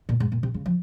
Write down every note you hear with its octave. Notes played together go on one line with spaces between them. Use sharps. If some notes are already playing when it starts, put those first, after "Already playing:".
A#2
G#2
A#2
C3
C#3
F3